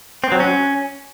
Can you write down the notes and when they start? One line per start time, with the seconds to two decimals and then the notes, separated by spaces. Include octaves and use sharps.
0.24 C4
0.32 F#3
0.40 C#4